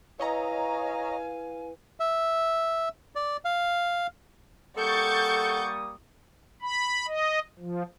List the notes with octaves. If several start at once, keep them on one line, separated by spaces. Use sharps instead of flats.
E4 B4 C#5 D#5 F5 G#5 A#5
E5
D5
F5
G3 A#3 A4 F#5 C#6 D#6 G6 A6
B5
D#5
F3